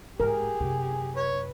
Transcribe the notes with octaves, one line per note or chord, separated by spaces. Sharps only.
A1 G#2 G4 G#4 A#4
F#2 C3
B4 C#5